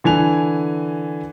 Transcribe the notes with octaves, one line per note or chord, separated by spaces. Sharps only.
D3 E3 G#5 F7